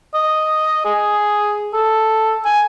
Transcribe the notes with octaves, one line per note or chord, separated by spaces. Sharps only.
D#5
G#4
A4
G#5